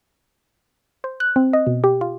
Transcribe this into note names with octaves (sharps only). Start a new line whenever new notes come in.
C5
F#6
C4
D#5
B2
G4
F4